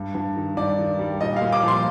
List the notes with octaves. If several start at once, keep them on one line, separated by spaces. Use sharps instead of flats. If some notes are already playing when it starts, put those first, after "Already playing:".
Already playing: G2
G2
D#3
G2 D5
D#3
G3
A#2 D#5
F5
A#2
D6
F3 C6